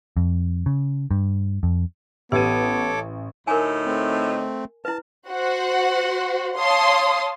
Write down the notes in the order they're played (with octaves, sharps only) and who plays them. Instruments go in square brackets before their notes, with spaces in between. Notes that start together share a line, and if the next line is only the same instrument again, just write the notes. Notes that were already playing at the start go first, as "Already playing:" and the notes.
[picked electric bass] F2
C#3
G2
F2
[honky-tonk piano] A1 D#7 [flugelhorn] B3 [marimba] G4 B4 [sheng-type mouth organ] A4 C#5 D6
[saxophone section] D2 A2 D#4 [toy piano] A#4 G#5
[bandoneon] A3 C4
[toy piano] E4 B4 [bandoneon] A5
[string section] F#4 C5 F#5
C#5 F5 A5 C6 D#6